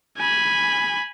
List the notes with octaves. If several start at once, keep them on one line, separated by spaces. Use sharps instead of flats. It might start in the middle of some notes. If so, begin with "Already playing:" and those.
G#5 B5